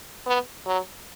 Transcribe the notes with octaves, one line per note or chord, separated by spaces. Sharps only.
B3
F#3